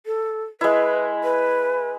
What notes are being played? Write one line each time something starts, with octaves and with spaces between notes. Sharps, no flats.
A4
G#3 E4 B4
B4